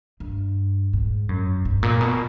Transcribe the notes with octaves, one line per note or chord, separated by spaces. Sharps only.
G2
G#2
F#2
G#2
A#2
B2